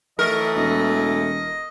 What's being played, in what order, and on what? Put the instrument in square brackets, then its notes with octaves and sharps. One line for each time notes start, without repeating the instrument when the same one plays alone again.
[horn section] E3 F#3 A3 [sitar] A#4 [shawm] D#5
[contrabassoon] E1 [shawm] D#5